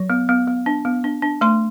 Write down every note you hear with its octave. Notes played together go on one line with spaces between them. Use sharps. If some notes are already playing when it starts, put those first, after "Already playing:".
Already playing: F#3
B3
B3
B3
D4
B3
D4
D4
A3 C6